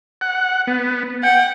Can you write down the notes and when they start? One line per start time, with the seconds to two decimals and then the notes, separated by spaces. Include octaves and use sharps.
0.21 F#5
0.67 B3
1.23 F#5 G5